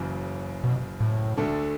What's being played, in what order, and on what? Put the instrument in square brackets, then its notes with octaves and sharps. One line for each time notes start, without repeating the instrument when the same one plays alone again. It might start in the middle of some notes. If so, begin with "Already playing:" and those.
Already playing: [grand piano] F#1 F#2 C#3 E3
[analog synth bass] B2
A2
[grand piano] D2 D3 A3 D4 A4